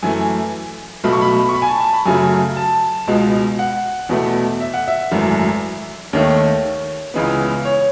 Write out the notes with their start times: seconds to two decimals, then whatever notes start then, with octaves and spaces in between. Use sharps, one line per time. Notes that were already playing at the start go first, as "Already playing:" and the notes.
0.03 F#2 E3 A3 G#5
1.04 B1 B2 A3 B5
1.13 C#6
1.21 B5
1.49 C#6
1.55 B5
1.62 G#5
1.67 A5
1.81 A5
1.93 B5
2.05 F#2 C#3 F#3 A3 G#5
2.57 A5
3.08 C#2 B2 G#3
3.59 F#5
4.09 E2 B2 A3
4.60 E5
4.74 F#5
4.88 E5
5.11 G#1 F#2 E3 A3
6.13 D#2 D#3 A3 C#5
7.14 C#2 C#3 E3 G#3 B3
7.65 C#5